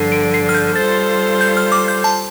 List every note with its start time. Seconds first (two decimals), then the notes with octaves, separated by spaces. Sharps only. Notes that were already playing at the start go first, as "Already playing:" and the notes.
Already playing: G2 D3 F3 C7
0.12 D7
0.34 C7
0.49 F6
0.55 G6
0.76 G3 F4 A4 C5 A6
1.41 G6
1.57 F6
1.72 D6
1.88 G6
2.04 A5